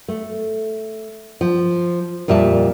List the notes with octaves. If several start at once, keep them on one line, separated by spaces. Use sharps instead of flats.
A3
F3
F2 A#2 G3 E5 A5